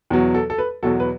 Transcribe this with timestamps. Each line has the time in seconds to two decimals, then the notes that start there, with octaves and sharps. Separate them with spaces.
0.10 E2 B2 F#3
0.34 A4
0.50 A4
0.58 B4
0.83 E2 B2 F#3 A4
1.00 B4